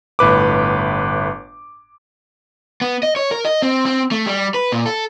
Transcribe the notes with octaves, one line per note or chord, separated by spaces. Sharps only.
G1 A2 B4 D6
B3
D#5
C#5
A#4
D#5
C4
C4
A3
G3
B4
A#2
A4